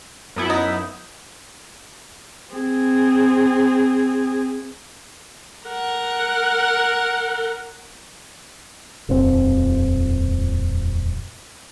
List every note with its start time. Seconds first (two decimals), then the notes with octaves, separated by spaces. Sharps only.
0.36 F#2 B3 E4
0.50 D#4
2.53 C4 G#4
5.67 A#4 F#5
9.09 D#1 F2 B2 C4